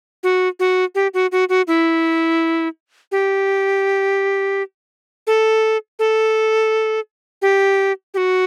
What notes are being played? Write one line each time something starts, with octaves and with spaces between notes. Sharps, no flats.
F#4
F#4
G4
F#4
F#4
F#4
E4
G4
A4
A4
G4
G4
F#4